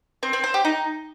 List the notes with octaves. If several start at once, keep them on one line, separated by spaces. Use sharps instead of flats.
C4
C4
C5
G4
D#4